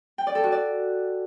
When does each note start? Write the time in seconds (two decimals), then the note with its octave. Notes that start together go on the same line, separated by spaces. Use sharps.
0.18 G5
0.27 D5
0.35 A4
0.44 F#4
0.52 D5